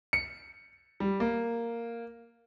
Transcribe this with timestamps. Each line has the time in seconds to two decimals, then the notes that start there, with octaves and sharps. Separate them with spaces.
0.13 C#7
1.00 G3
1.20 A#3